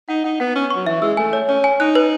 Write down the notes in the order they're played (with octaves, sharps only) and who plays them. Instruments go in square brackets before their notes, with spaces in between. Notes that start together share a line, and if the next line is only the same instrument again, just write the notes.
[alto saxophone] D#4 [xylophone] F#5
[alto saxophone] D#4 [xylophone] F#5
[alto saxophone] B3 [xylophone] F#5
[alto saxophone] C#4 [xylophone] C#6
[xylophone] C#6
[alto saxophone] F#3
[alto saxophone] E3 [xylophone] E5
[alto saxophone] G#3 [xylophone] E6
[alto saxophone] A3 [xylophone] G#5
[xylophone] C#5
[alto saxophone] C#4 [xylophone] C#5
[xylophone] G#5
[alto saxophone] D#4 [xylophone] F#6
[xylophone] B4